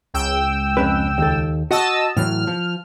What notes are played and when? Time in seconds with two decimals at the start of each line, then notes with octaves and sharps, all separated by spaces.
0.14 C#2 G5 E6
0.77 F2 C#4 B4
1.18 D#2 A4
1.71 F#4 D#5 F#5 A5 E6
2.16 A2 E3 F#3 F6
2.47 F3